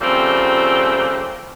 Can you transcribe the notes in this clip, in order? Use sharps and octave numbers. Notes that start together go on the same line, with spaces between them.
C#3 F3 G3 A3 A#3 C4